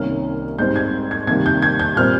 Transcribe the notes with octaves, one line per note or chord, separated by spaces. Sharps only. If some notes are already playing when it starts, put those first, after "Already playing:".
Already playing: C2 C3 D#3 A#3 C#4 F6
G#2 G3 C4 G6
G#6
G#6
C3 D#3 G3 A#3 G#6
G6
G#6
G6
A#2 G3 C4 F6